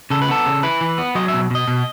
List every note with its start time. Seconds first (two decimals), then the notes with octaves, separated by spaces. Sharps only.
0.10 C#3 A4
0.22 B4
0.29 B3 A4
0.46 C#3
0.63 E4 B4
0.81 E3
0.98 B3
1.15 F#3 D#5
1.28 E5
1.33 B2
1.51 B2 D#5
1.68 B2